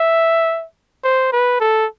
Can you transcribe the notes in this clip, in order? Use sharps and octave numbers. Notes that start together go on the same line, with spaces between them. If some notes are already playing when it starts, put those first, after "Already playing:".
Already playing: E5
C5
B4
A4